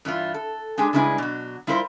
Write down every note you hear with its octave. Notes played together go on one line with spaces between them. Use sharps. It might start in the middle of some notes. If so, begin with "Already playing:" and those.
G2 E3 E4 F4
A4
G#3 D4 G4 G#4
C#3 G3 G#3 D4 E4 B4
B2 F#3
G3 E4 F4 A#4 C5